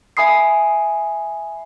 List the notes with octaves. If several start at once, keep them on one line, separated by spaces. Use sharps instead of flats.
E5 G#5 B5 D#6 C7